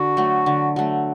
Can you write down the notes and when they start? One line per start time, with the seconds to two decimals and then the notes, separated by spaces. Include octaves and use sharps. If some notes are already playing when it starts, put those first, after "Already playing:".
Already playing: D3 F#4
0.17 F#3 A3
0.46 D3
0.76 F#3 A3